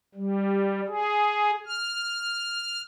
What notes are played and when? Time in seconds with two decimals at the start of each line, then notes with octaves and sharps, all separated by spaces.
0.15 G3
0.88 G#4
1.66 F6